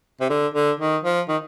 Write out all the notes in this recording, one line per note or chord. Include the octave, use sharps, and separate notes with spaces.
C3
D3
D3
D#3
F3
D#3